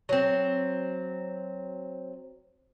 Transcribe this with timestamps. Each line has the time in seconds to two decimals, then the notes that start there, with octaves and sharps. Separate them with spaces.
0.09 F#3 C4